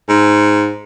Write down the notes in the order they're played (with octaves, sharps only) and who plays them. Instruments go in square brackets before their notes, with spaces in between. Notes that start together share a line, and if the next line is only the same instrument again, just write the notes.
[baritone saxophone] G#2